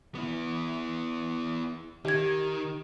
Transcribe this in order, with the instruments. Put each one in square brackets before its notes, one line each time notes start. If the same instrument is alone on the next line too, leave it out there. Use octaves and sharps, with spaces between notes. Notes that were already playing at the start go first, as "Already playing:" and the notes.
[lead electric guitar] B3 E4
[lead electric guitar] D#3 [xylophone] G4 G#6